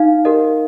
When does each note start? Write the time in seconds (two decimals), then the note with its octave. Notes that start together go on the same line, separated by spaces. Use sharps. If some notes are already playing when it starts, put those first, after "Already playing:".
Already playing: D#4 F5
0.25 G4 A#4 D#5